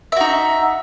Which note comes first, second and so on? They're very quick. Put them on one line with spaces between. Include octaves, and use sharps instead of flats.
E5 F#4 D#4